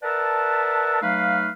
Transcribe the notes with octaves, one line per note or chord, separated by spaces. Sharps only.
A#4 B4 D5 E5 F#5 A5
F#3 A3 D#4 B4 F5